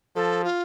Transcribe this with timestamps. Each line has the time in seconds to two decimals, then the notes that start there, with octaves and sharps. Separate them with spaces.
0.15 F3 A4
0.44 F4